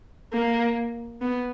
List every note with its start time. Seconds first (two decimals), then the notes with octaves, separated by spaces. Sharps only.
0.33 A#3
1.21 B3